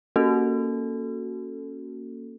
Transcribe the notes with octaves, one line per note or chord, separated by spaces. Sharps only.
A#3 C#4 F#4 A4